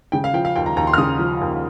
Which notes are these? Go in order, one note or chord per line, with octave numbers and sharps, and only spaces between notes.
C#3 G5
F5
F3 G5
F5
D#2 G5
A#5
D#2 A#5
C6
F6
C#3 D#6
F3
D#2